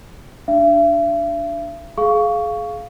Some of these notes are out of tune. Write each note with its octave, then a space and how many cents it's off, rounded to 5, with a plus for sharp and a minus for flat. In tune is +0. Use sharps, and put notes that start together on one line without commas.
D4 +0 E5 +45
G#4 +30 F5 +0 C#6 +15